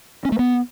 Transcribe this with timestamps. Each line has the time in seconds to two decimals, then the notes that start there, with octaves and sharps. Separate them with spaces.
0.25 C#4
0.32 A3
0.39 B3